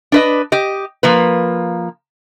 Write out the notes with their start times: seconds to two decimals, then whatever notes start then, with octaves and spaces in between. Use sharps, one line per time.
0.12 D4 B4 D#5
0.52 G4 D#5
1.03 F3 A#3 B4